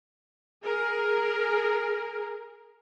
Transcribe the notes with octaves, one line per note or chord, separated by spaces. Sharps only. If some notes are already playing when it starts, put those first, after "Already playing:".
G#4 A#4